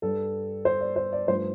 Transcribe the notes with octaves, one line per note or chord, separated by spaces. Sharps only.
G2 G3 A4
C5
D5
C5
D5
G2 F3 A3 C5